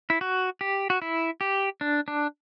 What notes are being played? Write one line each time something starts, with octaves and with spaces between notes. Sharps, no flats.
E4
F#4
G4
F#4
E4
G4
D4
D4